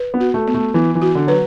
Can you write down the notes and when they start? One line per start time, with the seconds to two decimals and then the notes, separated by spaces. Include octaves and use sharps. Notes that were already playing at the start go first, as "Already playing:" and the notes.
Already playing: B4
0.14 B3
0.20 F#4
0.34 A3
0.47 B3
0.54 A3
0.74 E3 B3
0.95 E3
1.02 F#4
1.15 D3
1.27 F#3 B4